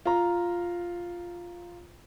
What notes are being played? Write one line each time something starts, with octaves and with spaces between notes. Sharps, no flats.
F4 A#5